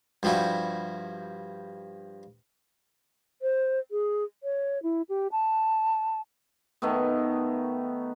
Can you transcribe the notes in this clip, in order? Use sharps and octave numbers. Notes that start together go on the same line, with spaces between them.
G2 F3 G3 E4 F#4
C5
G#4
C#5
E4
G4
A5
D#3 A3 B3